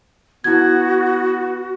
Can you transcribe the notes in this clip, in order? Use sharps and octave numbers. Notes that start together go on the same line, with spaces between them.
B3 E4 F#4 G#6